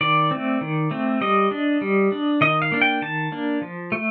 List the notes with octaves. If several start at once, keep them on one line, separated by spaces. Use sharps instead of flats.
D#3 D5
A3 C4
D#3
A3 C4
G3 D#5
D4
G3
D4
D#3 D#5
F5
A#3 D4
G5
D#3 A5
A#3 D4
F3
A3